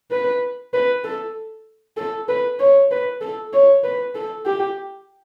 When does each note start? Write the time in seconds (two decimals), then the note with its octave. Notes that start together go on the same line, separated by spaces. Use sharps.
0.11 B4
0.73 B4
1.04 A4
1.97 A4
2.28 B4
2.59 C#5
2.91 B4
3.21 A4
3.53 C#5
3.84 B4
4.15 A4
4.45 G4